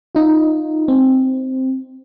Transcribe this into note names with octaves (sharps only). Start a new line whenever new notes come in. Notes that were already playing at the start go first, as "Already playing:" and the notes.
D#4 F4
C4